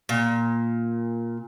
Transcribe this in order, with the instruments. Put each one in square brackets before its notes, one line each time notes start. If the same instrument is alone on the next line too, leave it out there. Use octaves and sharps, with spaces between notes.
[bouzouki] A#2